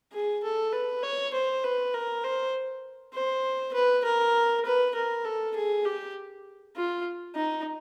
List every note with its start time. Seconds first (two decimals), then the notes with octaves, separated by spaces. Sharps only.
0.13 G#4
0.44 A4
0.73 B4
1.03 C#5
1.34 C5
1.64 B4
1.94 A#4
2.24 C5
3.14 C5
3.74 B4
4.05 A#4
4.66 B4
4.95 A#4
5.25 A4
5.55 G#4
5.85 G4
6.76 F4
7.35 D#4